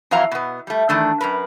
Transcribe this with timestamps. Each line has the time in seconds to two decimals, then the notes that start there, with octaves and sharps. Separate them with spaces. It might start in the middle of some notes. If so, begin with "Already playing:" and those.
0.11 F2 E3 F#3 F5 A#5
0.31 B2 B3
0.67 G3 A3
0.89 D#3 E3 A3 D4
1.21 F#2 A#4 B4